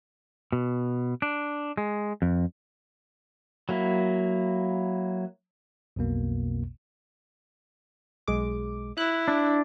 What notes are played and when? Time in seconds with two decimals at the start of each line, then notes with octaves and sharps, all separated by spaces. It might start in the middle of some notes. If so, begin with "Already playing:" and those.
0.52 B2
1.22 D4
1.77 G#3
2.22 F2
3.69 F#3 A#3 E4
5.96 B1 F2 B2 A#3
8.28 B1 G#3 D6
8.98 E4 F#6
9.28 D4